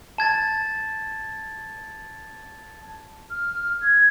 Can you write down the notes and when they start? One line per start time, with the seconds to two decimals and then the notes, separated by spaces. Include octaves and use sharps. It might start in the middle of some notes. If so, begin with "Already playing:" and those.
0.18 A5 G#6 A6
3.30 F6
3.82 G#6